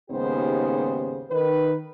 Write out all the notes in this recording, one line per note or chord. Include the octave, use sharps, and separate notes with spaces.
D#2 G#2 C#3 B3 G4 C5
D#3 B4